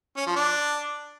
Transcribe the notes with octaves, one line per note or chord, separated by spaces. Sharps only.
C#4
F3
D4